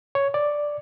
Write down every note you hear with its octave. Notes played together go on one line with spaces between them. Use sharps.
C#5
D5